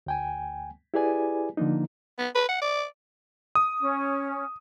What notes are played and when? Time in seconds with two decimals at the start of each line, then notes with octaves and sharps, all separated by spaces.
0.06 D2 G5 G#5
0.94 E4 G4 G#4 B4 D5 G#5
1.57 D3 F3 A#3 D4 D#4
2.19 B3
2.35 B4
2.49 F#5
2.62 D5
3.55 D#6
3.80 C#4